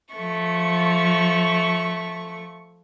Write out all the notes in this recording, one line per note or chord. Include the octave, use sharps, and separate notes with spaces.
F3 A3 C#6